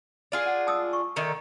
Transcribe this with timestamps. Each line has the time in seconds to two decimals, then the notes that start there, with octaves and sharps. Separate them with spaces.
0.32 D4 F4 G#4
0.46 F#5
0.67 A5 D#6 E6
0.93 C#6
1.16 D3 D#3 A3